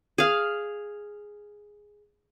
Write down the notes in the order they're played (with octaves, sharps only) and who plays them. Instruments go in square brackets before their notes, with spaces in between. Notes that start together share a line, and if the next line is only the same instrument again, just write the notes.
[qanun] G#4 F5